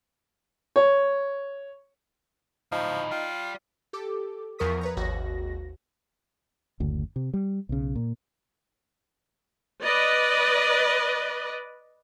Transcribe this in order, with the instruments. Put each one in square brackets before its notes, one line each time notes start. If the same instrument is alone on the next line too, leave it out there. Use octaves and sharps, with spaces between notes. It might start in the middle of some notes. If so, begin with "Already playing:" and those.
[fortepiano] C#5
[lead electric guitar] D2 A2 [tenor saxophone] F3 [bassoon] D#4
[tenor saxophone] F4 [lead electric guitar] D5 G5
[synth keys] G4 A4 D6
E2 F3 A#4 C#6 D#6 B6
B4 C#5 A#5
G#1 D#2 F#4 A#6
[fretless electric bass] F#1 D2
C3
G3
B1 C#3
A#2
[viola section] B4 D5 D#5